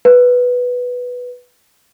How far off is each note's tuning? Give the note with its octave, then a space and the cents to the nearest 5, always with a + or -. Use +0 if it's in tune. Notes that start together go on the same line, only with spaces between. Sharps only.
B4 +0